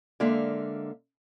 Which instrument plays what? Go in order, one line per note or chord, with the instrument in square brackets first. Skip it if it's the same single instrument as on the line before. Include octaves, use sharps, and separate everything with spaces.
[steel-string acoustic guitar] D3 G#3 A#3 E5 F5